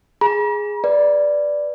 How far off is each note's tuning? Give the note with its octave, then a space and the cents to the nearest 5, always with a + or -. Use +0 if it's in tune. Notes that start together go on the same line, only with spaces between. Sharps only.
G#4 +0 A#5 +45
B4 +0 D5 +0